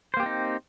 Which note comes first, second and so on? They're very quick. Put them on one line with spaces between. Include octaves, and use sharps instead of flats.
C5 A#3 G4 C4 D#4